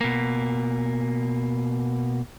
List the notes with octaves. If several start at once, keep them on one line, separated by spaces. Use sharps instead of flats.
B2 A#3